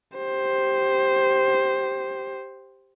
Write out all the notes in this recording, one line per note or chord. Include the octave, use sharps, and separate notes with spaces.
G4 C5